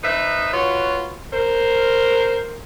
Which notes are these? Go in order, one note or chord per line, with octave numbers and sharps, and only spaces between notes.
D#4 B4 C5 E5
F4 F#4 B4 C#5
A#4 C5